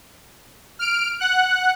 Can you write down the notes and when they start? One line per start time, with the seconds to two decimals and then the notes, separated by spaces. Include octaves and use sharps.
0.79 F6 D7
1.20 F#5 F#6